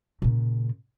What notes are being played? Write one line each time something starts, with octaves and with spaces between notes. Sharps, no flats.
A#2 C#3